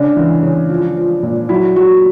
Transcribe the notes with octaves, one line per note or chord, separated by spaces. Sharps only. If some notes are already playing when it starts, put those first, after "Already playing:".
Already playing: C#3 D4
E3
C#3
F3
F3
A#2
F#3 E4
F#3 F#4